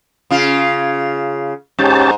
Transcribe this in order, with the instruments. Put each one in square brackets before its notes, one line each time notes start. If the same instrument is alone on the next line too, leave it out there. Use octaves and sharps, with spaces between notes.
[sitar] C#3 F4
[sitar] G#2 [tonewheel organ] C#4 G4 A5